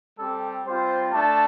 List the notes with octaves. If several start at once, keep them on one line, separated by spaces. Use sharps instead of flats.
G3 C4 G4 A4
G3 C4 F4 C5
A3 D4 A5